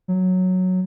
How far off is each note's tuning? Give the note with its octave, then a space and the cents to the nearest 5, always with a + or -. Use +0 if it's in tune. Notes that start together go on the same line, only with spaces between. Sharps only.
F#3 -5